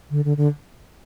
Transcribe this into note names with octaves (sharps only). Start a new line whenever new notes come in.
D3
D3
D3